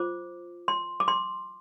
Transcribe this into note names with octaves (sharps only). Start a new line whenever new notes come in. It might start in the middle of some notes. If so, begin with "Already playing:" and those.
Already playing: F4 C5 D6
C6
D6
C6